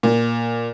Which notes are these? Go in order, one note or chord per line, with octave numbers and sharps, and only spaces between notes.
A#2